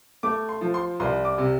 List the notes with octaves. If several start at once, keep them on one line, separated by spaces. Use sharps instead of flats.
A3 D6
C6
F3
C6
C2 C6
D6
C3